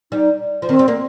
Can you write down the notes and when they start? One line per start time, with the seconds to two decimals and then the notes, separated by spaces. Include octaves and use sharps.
0.12 G3 D#4
0.62 F3
0.69 D#3 C4
0.79 G3
0.88 A#3